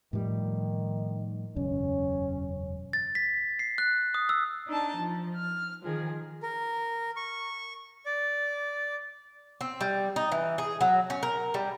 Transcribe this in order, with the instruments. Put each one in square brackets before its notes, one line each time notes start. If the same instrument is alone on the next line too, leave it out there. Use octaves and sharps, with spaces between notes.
[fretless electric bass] A2 F3 G3 [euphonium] D#3
[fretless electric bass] E1 F#2 C#3 [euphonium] C#4
[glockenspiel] A6
B6
C7
F#6
D#6
E6
[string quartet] D4 D#4 A5
F3
F6
D#3 F3 G#4
[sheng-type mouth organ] A#4
C#6
D5
[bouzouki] C4
G3
D#4
E3
G#4
F#3
C#4
A#4
G3